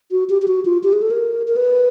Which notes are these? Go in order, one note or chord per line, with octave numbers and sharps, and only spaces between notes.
F#4
G4
G4
F#4
F4
G4
G#4
A4
A#4
A#4
B4